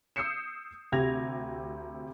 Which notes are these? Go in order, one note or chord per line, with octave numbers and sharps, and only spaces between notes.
D#6 E6 G6 C7 C#7 E7
D2 C3 G4 G#6 A#6 F7